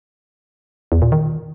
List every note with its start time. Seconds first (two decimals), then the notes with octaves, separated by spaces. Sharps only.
0.92 E2
1.02 A#2
1.12 D#3